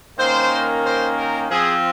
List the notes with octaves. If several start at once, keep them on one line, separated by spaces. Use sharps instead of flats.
D#3 A#3 C#4 C5
C5
A#4
F3 C4 G#4